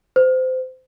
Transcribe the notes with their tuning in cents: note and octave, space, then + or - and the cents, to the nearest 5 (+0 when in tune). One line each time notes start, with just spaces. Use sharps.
C5 -25